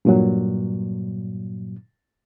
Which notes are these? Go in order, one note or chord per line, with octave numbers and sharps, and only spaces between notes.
G2 A#2 F#3